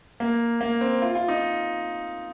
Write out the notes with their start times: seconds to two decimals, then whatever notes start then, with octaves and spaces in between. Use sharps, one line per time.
0.20 A#3
0.61 A#3
0.81 C4
1.02 F4
1.15 F4
1.28 D#4